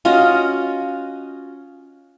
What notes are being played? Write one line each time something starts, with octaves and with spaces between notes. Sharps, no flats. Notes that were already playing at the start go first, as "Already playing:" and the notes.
C#4 F4 F#4 D#5